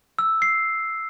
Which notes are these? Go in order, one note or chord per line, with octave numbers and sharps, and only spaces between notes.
E6
C7